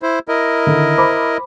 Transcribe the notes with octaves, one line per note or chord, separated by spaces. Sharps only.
E4 C5
E4 A#4 D#5
D3 D#3
C5 B5 D6